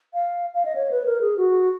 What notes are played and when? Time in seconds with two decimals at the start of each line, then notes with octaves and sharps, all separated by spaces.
0.14 F5
0.55 F5
0.65 D#5
0.75 C#5
0.91 B4
1.05 A#4
1.21 G#4
1.37 F#4